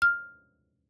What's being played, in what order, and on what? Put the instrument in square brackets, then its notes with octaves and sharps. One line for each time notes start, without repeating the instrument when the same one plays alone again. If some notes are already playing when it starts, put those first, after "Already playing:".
[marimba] F6